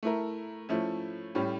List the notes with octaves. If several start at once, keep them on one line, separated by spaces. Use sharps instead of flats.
A3 E4 A#4
F3 A3 C#4 E4
A2 G3 C#4